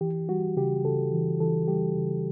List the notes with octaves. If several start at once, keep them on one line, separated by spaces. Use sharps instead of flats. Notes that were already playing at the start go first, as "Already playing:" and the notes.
E3 G4
G3 F#4
C#3 G4
C#3 A4
E3
E3 A4
G3 G4
C#3